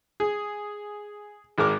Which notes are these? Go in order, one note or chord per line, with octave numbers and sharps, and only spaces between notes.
G#4
G#1 G#3 A#4 D6